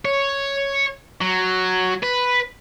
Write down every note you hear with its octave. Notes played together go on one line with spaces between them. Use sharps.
C#5
F#3
B4